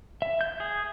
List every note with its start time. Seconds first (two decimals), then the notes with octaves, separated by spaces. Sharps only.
0.22 E5
0.41 G6
0.60 G#4